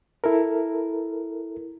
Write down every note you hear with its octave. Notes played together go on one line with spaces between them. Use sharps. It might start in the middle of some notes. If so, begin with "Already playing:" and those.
E4 A4 A#4